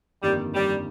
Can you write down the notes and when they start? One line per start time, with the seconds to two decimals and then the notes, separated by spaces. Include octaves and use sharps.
0.22 G1 F2 D#3 G3 A#3
0.54 G3